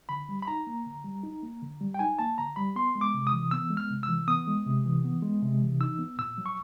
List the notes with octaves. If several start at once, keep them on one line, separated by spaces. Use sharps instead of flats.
D3 B5
G3
B5
D#4 A#5
A#3
D3
G3
D#4
A#3
D3
G3
G5
D#4 G#5
A#3 A5
D3 A#5
G3 B5
B3 C6
G#3
D6
C3
D#6
E3
B3 E6
G#3
F6
C3
E6
E3
B3 D#6
G#3
C3
E3
B3
G#3
C3
E3
D#4 E6
B3
A#2 E6
F#3
C#6